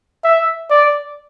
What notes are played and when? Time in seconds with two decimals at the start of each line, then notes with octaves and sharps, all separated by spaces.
0.24 E5
0.70 D5